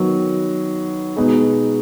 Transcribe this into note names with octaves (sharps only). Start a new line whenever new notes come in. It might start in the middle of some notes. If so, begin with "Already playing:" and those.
Already playing: D#3 F#3 B3
B2 G#3 B3 D#4 G#4